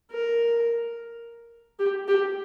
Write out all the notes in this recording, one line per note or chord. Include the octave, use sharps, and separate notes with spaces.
A#4
G4
G4